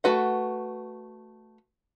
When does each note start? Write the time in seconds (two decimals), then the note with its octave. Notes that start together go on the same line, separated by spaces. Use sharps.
0.04 A3 F#4 B4 F#5